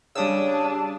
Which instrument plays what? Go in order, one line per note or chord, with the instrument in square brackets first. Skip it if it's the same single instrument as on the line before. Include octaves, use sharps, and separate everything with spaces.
[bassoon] C#3 [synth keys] G3 D#6 E6 [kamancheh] D4 A5